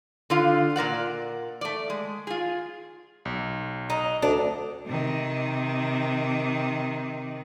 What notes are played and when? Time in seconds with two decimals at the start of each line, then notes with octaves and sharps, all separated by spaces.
0.30 D3 F4 F5
0.76 A#2 A#4 D5 F#5
1.61 A3 D5
1.90 G#3
2.27 F4 G#4
3.25 B1
3.90 D#4
4.22 D2 D4
4.86 C3 D#3